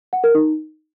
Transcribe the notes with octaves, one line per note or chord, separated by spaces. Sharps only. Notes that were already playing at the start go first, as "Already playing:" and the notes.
F#5
A#4
D#4